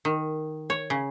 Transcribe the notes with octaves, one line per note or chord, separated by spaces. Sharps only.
D#3
C#5
C#3